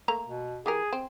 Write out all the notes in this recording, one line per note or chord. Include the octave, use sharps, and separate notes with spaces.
A3 A#3 A#5
B2
E3 G4 G#4 A#4
C4